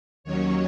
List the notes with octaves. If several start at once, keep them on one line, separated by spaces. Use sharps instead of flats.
D#2 D#3 F#3 C#4 C#5